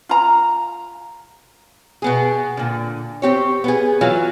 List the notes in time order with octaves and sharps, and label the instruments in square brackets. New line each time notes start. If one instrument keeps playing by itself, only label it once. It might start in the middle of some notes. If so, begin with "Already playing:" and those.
[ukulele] F4 A#5
[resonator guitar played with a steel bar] B2 B3 G#4
A#2 D3
C4 G4 C#5
B3 G#4
E3 F#3 F4